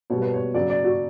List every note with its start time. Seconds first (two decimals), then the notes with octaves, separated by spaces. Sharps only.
0.10 B2 G3 C#5
0.22 B4
0.34 C#5
0.54 C#3 F#3 D5
0.70 D5
0.84 F#4